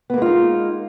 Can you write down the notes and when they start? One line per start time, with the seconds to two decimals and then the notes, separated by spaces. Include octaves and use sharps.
0.10 B3
0.14 A#3
0.18 G#3
0.22 F4
0.26 D#4